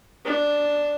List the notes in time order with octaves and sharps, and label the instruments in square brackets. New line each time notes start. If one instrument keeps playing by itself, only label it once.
[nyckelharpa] D4